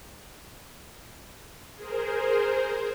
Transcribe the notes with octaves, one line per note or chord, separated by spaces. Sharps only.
G#4 A#4 C5